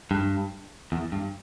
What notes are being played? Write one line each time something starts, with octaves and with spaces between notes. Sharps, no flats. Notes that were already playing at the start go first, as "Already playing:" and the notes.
G2
E2
G2